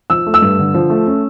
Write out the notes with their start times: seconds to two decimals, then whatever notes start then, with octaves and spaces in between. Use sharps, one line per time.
0.10 F3 E6
0.26 A3
0.34 E6
0.42 G2
0.59 D3
0.74 F3
0.90 A3
1.07 C#4